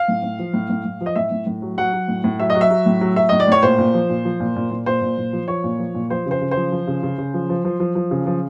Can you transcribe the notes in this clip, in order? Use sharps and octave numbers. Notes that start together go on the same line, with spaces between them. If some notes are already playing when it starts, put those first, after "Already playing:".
Already playing: F5
A2
A2
F3
A2
A2
A2
F3
D#5
A2 E5
A2
A2
F#3
F#3 F#5
F#3
A2
A2
F#3 E5
D#5
F#3
E5
F#3
A2
F#3
F#3 E5
A2 D#5
D5
A2 C#5
A#2 C5
A#2
F3
A#2
F3
A#2
A#2
A#2
A#2 C5
A#2
A#2
F3
F3 C#5
A#2
F3
A#2
F3 C5
C#3 C5
C#3
C5
F3
F3
C#3
C#3
C#3
F3
F3
F3
F3
F3
C#3
F3